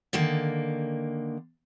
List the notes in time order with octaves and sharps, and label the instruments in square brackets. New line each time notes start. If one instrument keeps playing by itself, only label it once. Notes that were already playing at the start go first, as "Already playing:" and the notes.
[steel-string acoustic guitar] D3 D#3 A#3